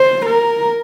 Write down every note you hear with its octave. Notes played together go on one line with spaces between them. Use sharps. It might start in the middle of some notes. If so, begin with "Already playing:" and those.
Already playing: C5
A#4